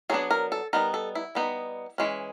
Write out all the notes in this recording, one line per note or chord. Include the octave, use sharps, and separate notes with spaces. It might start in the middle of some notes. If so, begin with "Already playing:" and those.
F#3 B3 D4 G#4
A#4
A4
G3 B3 D#4 A#4
A4
E4
G3 B3 D#4
E3 G#3 C#4